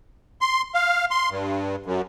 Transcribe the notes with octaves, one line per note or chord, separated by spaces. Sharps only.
C6
F5
C6
G2
F#2